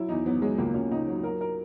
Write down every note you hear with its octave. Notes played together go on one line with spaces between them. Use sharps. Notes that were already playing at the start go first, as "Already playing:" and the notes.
Already playing: F#3 E4
E2 D#4
F#3 B3
F#3 G#3
C#2 A#3
C#2 C#4
C#2 D#4
F#3
F#3 A#4
A#4